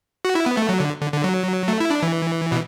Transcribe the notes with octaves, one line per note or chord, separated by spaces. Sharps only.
F#4
E4
B3
A3
F#3
D3
D3
D3
F#3
A3
E4
D4
E3
B2